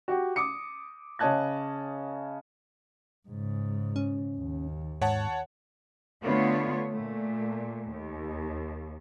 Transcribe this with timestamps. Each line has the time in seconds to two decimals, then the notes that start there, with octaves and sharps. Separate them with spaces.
0.08 F#4 G4
0.36 D6 D#6 C#7
1.19 C#3 C#5 D#5 A5 F#6 G#6
3.28 G#2 C#3
3.96 C#4
4.36 D#2
5.02 G#2 C#5 F#5 A5
6.23 D3 A3 B3 F4 C#5
6.91 A#2 A3
7.89 D#2